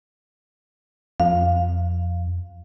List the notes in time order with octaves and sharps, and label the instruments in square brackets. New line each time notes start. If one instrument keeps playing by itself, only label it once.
[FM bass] F2 [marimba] F5